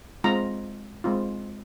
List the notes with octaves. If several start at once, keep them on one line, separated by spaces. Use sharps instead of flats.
G#3 C4 F4 A#5
G#3 C4 F4